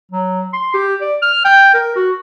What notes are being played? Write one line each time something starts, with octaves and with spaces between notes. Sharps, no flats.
F#3
C6
G4
D5
F6
G5
A#4
F#4